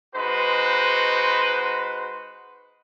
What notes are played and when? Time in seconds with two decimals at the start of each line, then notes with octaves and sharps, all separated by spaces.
0.15 G#3 D#4 F#4 B4 C5